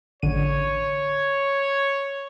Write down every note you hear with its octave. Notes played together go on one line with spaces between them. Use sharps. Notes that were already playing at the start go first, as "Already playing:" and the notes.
A1 D3 C#5 D#7